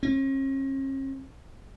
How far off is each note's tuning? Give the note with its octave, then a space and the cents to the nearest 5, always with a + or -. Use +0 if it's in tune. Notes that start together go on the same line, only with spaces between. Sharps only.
C#4 -45